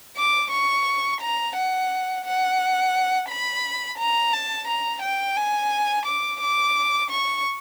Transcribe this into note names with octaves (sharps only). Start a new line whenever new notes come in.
D6
C#6
A#5
F#5
F#5
B5
A#5
A5
A#5
G5
G#5
D6
D6
C#6